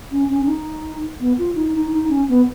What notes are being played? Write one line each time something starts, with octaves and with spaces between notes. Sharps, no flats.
C#4
C#4
C#4
D#4
B3
F4
D#4
D#4
D#4
C#4
B3